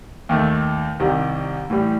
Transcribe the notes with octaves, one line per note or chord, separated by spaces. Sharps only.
D#2 D#3 A3
C2 C3 D#3 G3
A2 E3 G3